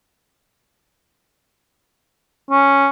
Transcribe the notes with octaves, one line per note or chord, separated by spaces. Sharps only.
C#4